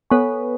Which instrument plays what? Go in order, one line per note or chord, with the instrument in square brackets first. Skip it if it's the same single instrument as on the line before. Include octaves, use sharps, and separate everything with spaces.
[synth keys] B3 [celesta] A4 C#5 G#5 C#6